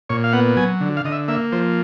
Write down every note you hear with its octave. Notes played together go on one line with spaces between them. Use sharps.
A#2 C#5
F5
B3 F#5
F#3 G#5
D3
F5
D3 D#5
E5
A#3 E5
F3 C5